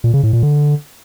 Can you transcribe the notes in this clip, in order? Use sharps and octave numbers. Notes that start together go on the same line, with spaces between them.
A#2
C#3
A2
A#2
D3